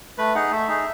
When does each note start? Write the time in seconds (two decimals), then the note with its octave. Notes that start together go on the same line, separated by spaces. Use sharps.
0.18 A3 B4
0.35 D#4 G#4 F#5
0.51 A3 E5
0.68 D#4 G#4